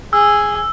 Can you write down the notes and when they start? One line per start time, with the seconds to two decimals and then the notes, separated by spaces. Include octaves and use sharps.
0.13 G#4 E6